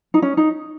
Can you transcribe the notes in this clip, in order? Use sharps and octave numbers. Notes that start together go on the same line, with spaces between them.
D#4
C#4
D#4